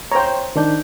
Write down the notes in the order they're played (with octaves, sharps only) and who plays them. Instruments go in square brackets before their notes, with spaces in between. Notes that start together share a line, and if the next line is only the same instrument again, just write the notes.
[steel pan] C5 A#5 [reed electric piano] C#5 G5
[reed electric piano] D#3 D4 G6